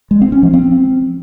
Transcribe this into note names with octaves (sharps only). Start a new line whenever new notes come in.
G#3
C4
C#4
F3
C4